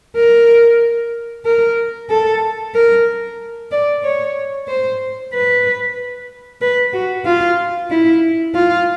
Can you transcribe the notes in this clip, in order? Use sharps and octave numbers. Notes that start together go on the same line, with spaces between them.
A#4
A#4
A4
A#4
D5
C#5
C5
B4
B4
F#4
F4
E4
F4